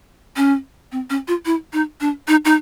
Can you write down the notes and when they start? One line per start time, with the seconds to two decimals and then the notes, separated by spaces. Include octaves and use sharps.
0.36 C#4
0.92 C4
1.10 C#4
1.28 F4
1.46 E4
1.73 D#4
2.01 D4
2.28 D#4
2.45 D#4